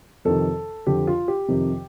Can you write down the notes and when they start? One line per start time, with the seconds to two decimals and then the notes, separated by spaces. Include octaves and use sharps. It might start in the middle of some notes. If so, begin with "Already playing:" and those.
0.25 F2 C3 D#3 A4
0.87 F2 D3 F3 G4
1.07 F4
1.28 G4
1.48 F2 C3 D#3